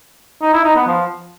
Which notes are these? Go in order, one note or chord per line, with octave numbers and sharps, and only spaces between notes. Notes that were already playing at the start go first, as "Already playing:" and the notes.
D#4
E4
D#4
B3
F3